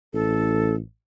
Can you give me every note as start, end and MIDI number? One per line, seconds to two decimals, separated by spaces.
0.14 0.78 33
0.14 0.75 69